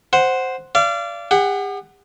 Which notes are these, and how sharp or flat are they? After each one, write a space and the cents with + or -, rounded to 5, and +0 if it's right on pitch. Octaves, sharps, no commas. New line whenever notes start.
C5 +0 F#5 +0
D5 -15 F5 -35
G4 +45 F#5 +10